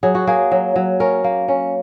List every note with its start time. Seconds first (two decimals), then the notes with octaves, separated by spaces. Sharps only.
0.03 F#3 G#4
0.15 F#4
0.27 A#3 G#4
0.52 F#3
0.76 F#3
1.00 C#4 A#4
1.24 A#3
1.48 C#4